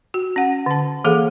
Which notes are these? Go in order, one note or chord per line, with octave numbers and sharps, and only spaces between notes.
F#4
C#4 F#5
D3 A5
E3 A#3 G#4 A4 F5